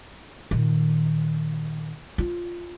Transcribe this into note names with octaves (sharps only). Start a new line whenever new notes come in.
A#2 D#3
F4